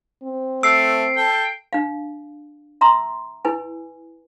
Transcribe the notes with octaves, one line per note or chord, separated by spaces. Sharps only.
C4
A3 E6 C7 D7
A4 G5
D4 F5
E5 A#5 C6 E6
E4 B4 G#5